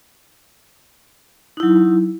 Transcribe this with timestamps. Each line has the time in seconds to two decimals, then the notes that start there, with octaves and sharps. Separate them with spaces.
1.57 D#4
1.60 E4
1.63 F#3